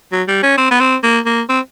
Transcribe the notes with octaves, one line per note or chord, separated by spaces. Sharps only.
F#3
G3
C#4
C4
B3
C4
A#3
A#3
C4